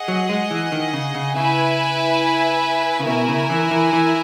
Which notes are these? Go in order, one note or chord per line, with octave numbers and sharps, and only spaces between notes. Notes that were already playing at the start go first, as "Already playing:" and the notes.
Already playing: G#4 D#5 F#5
F#3
G#3
E3
D#3
C#3
C#3
C#3 E4 B4 E5 G#5
C#3
B2 E4 A#4 E5 G#5
C#3
E3
E3
E3